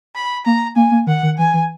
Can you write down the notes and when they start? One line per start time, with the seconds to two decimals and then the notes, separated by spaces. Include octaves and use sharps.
0.15 B5
0.45 A#3 A#5
0.76 A#3 G#5
0.91 A#3
1.07 D#3 F#5
1.23 D#3
1.38 E3 G#5
1.54 E3